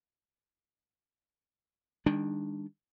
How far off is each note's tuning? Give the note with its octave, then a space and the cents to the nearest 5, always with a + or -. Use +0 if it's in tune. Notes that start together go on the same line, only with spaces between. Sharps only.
D#3 +0 G#3 -45 D4 +0